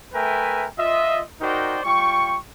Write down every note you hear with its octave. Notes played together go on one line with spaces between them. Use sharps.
A3 A#4 B4 E5 G5 G#5
F4 D#5 E5
D#4 F#4 A#4 C5 D5 G5
G3 F4 G5 C#6